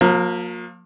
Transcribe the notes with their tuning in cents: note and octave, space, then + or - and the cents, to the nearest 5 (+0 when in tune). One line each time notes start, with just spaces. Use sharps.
F3 +40 A#3 +0